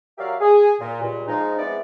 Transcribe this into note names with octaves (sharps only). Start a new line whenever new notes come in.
F#3 G4 A#4 D5 E5 F5
G#4
A#2
C#2 G2 A#2
F3 G#3 D#4
G#3 B3 C4 E4 D5